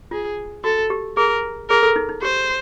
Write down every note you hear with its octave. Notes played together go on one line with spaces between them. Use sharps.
F4 G#4
F#4 A4
G4
G#4 A#4
G#4 A#4
A4
D#4
D#4
G4 C5